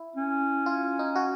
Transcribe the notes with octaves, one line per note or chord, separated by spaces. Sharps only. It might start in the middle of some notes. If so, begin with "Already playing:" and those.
Already playing: E4
C#4
F4
D#4
F#4